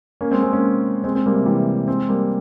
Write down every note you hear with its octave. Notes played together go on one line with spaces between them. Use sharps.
A#3 C#4
G#3 C4
G#3 C4
A#3 C#4
G#3 C4
G#3 C4
G3 A#3
C3
E3 G3
G#3 C4
G3 A#3